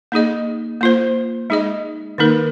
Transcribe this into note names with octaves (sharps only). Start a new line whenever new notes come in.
A#3 D#4 G#4 D#5
A#3 F4 C5
G#3 D#4 G#4 D#5
D#3 A#3 D#4 A#4